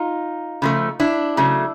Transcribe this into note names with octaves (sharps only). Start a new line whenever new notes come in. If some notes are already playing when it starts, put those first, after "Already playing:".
Already playing: D#4 F4
C#3 F3 A3
D4 E4
C#3 F#3 A3